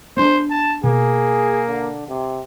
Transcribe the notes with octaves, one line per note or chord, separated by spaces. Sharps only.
B3 D4 C5
A5
B2 A#3 G#4
D3
C3